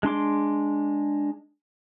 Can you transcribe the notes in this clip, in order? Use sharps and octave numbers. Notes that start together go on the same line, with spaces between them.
G#3 D4 C6 D6